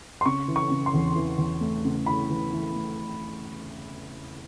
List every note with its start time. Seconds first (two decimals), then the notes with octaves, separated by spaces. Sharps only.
0.21 C6
0.26 C#3 C#6
0.48 E3
0.56 C#6
0.70 C#3
0.86 C6
0.94 E2
1.16 E3
1.38 E2
1.61 A3
1.85 C#3
2.06 E3 B5
2.30 E3
2.52 E3
2.76 A3